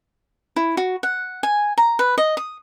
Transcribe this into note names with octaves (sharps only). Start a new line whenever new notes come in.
E4
F#4
F#5
G#5
A#5
B4
D#5
D#6